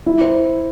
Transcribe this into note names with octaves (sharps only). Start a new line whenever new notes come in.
E4
C5